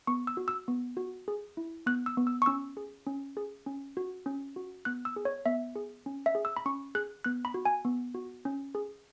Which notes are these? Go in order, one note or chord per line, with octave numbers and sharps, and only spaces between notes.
B3 C#6
E6
F#4
E6
B3
F#4
G#4
E4
B3 F#6
E6
B3
E6
C#6
C#4 E6
G#4
C#4
G#4
C#4
F#4
C#4
F#4
B3 F#6
E6
G#4
C#5
B3 E5
G#4
C#4
E5
G#4
E6
B5
C#4 C#6
G#4 F#6
B3 F#6
B5
F#4
G#5
B3
F#4
C#4
G#4